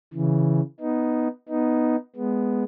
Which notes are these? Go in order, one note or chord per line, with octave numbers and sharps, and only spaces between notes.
C#3 E3
B3 D#4
B3 D#4
G#3 B3